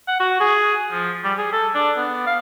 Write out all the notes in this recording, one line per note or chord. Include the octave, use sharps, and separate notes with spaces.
F#5
F#4
G#4
F3
G3
G#4
A4
D4
B3
F5